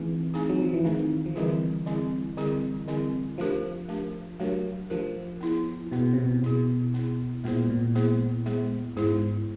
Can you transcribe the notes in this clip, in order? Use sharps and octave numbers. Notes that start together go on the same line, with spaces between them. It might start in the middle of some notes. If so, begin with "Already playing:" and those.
Already playing: E3 A3 C4 D#4 G#4
A3 C4 D#4 G#4
F#3
F3
E3
D#3 A3 C4 D#4 G#4
F3
D3 E3 G3 C4 E4 G#4
D3 G3 C4 E4 G#4
D3 G3 C4 E4 G#4
D3 G3 C4 E4 G#4
F3 A3 D4 G4 A#4
A3 D4 G4 A#4
F#3 A3 D4 G4 A#4
F3 A3 D4 G4 A#4
B3 E4 G#4
B2 B3 E4 G#4
C3
B2
B2 B3 E4 G#4
B3 E4 G#4
A#2 G#3 B3 E4 G#4 C5
A#2
G#3 B3 E4 G#4 C5
G#3 B3 E4 G#4 C5
G#2 G#3 B3 E4 G#4 C5